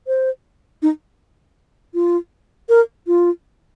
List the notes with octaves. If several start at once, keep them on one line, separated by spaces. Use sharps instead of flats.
C5
D#4
F4
A#4
F4